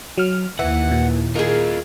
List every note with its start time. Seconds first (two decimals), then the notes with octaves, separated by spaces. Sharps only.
0.18 F#3 F6
0.59 D#2 E3 E5 F#5
0.91 A#2
1.36 F4 G#4 A#4 D#5